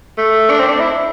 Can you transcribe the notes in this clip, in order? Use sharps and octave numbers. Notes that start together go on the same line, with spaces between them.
A3
D4
C4
D4
E4